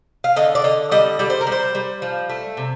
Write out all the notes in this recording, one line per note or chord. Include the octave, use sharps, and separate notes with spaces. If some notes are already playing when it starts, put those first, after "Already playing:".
F5
D3 D#5
D5
D3 D#5
G3 D#5
G3 D5
C5
A#4
G3
C5
G3
F3
A3
C3